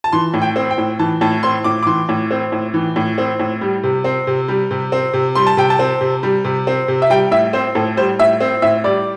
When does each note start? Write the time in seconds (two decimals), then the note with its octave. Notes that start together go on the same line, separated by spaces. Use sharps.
0.04 A5
0.12 E3 C6
0.34 A2
0.42 G5
0.56 C4
0.71 G5
0.78 A2
0.99 E3 A5
1.21 A2 A5
1.43 C4 C6
1.64 A2 D6
1.83 D6
1.86 E3 C6
2.09 A2
2.31 C4
2.52 A2
2.74 E3
2.96 A2
3.18 C4
3.39 A2
3.61 G3
3.83 C3
4.04 C4
4.27 C3
4.48 G3
4.71 C3
4.92 C4
5.13 C3
5.35 G3 C6
5.47 A5
5.57 C3 G5
5.70 A5
5.79 C4
6.01 C3
6.23 G3
6.44 C3
6.67 C4
6.88 C3
7.02 E5
7.10 G3 G5
7.31 A2 E5
7.53 C4 C5
7.75 A2 A4
7.97 G3 C5
8.19 A2 E5
8.40 C4
8.62 A2 E5
8.84 G3 D5